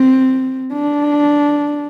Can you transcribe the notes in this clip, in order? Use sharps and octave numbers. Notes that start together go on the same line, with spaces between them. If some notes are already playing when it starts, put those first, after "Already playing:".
Already playing: C4
D4